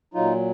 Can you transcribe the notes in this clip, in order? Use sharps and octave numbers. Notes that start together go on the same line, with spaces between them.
A#2 F#3 D#4 F4